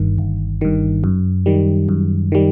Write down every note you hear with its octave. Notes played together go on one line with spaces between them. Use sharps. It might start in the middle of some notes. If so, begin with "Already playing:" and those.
Already playing: G1 G2 D#3
G1
G2 D#3
F#2
D#3 G3
F#2
D#3 G3